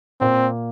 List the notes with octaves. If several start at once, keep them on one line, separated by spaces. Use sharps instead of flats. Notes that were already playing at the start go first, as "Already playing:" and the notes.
A#2 A#3 C4 F4